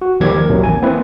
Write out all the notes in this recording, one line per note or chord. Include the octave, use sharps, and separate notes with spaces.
F#4
D#2 D#3 F3 G3 G4 G#6
A#4
A1 D#2 C3 D#3 F#3
G#5
A#3 C4 E4 B4